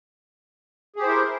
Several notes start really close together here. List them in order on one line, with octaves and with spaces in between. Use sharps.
G#4 G4 C5 E4 A#4